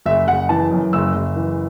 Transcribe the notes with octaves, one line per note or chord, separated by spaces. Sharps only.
F#1 E5
F#1 F#5
E3 A5
F#2
F#1 E6
F#1
E3